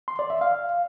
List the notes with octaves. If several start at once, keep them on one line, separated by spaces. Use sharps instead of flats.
C6
D5
E5
F5